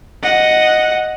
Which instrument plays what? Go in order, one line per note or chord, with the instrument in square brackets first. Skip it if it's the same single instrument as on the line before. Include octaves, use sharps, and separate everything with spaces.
[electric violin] D#5 F#5